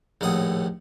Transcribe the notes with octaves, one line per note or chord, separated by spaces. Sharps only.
A#1 D#2 A2 F#5 D#6